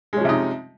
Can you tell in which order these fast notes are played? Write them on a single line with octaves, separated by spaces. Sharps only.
G#3 C#4 F3 C3 D#4